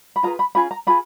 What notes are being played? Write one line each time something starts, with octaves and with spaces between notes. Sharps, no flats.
B5
F4 G#4 B4 A#5
B5
C#4 F4 G#4 B5
A#5
F4 G#4 B5